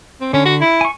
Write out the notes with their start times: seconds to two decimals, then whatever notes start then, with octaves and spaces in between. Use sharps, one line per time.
0.21 C4
0.33 D3 C#4
0.45 F#4
0.61 E4
0.81 G#5 C#6